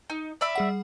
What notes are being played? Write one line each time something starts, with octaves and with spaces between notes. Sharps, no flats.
D#4
D5 E5 B5
G3 G#4 F#5